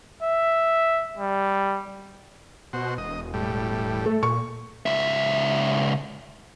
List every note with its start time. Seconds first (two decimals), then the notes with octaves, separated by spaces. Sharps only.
0.23 E5
1.18 G3
2.73 B2 F#4 C5
2.98 E1 D#5
3.34 A2 G3
4.06 A3 A4
4.23 A#2 C#6
4.86 C#2 E5